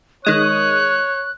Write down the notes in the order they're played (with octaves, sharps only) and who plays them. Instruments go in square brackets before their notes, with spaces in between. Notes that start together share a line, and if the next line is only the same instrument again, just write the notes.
[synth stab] D#3 G#3 D#6 [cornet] C#5 [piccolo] F#6